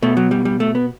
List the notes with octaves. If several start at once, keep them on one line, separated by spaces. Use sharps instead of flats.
B2 A3
F#3
G3
G3
A3
B3